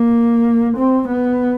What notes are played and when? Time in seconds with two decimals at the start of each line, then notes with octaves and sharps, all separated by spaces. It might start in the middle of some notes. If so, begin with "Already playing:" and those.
Already playing: A#3
0.77 C4
1.08 B3